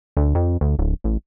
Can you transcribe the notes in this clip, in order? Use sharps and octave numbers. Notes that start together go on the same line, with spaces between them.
D2
F2
D2
D1
A1